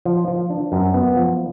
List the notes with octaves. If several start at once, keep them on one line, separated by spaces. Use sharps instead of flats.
F3
F3
D4
F#2
B3
F3